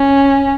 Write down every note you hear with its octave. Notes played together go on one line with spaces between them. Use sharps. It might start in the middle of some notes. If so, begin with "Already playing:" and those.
Already playing: C#4